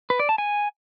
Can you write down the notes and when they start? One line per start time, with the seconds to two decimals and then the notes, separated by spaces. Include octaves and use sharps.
0.10 B4
0.20 D5
0.29 A5
0.38 G#5